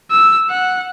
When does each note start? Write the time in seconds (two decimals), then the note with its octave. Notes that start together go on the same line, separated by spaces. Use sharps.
0.11 E6
0.50 F#5